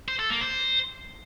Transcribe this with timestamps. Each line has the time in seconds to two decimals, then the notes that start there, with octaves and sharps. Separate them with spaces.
0.08 C5
0.19 A4
0.30 A#3
0.41 C5